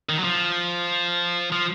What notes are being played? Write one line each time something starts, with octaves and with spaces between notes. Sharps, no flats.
D#3
F#3
F3
F3